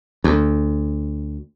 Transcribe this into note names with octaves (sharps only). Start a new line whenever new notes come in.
D2